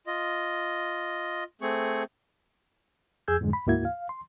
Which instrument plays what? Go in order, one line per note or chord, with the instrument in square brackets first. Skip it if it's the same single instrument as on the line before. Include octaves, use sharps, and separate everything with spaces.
[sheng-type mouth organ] F4 D#5
A3 C4 G#4 C#6
[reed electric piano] F2 G#4 E6 G6 G#6
F2 G#2 D3 G#3
B5
D2 G#2 A#3 E4 F#4 G#6
F5
C6